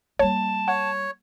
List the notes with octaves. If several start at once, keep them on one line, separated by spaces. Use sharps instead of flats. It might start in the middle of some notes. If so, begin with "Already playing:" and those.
G3 A#3 C#5 A5
C#5 F#5